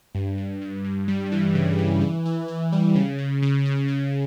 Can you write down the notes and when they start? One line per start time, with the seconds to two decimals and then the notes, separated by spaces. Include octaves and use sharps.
0.15 G2
0.38 G2
0.62 G2
0.85 G2
1.08 G3
1.32 E3
1.55 C#3
1.78 E3
2.01 E3
2.26 E3
2.48 E3
2.72 G3
2.95 C#3
3.19 C#3
3.42 C#3
3.66 C#3
3.88 C#3